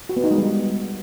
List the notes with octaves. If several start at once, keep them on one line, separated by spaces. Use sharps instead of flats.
F#4
B3
D#4
G#3
G3